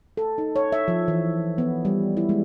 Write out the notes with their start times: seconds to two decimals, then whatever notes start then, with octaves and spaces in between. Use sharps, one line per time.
0.17 A4
0.38 D#4
0.56 C#5
0.72 E5
0.88 F3
1.08 E3
1.58 B3
1.85 G3
2.17 E4
2.29 G#3